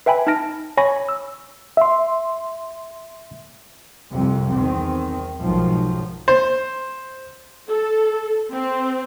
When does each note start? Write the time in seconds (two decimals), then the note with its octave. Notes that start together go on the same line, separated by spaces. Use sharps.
0.06 B4 E5 G5 G#5 B5
0.27 D#4 A5 F6 A#6 D7
0.77 C#5 G#5 B5 C#6 A#6
1.09 E6
1.77 E5 C6
4.11 C2 F2 C3
4.54 E2 D#3 C4
5.40 B1 G#2 D#3 F3 F#3
6.28 C5
7.69 A4
8.50 C4